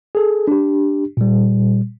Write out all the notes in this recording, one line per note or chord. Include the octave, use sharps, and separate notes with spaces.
G#4 A4
D4 G4
A#2 G3